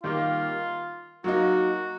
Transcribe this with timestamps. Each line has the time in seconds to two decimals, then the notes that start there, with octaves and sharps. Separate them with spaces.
0.04 D#3 G3 A#3 F4
1.24 F#3 A#3 D#4 F#4